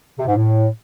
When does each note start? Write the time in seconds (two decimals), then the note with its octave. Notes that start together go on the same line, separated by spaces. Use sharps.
0.18 C3
0.26 G#2
0.35 A2